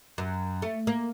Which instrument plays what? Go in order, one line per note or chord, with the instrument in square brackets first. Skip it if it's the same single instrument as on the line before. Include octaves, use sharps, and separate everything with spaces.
[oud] F#2
A3
A#3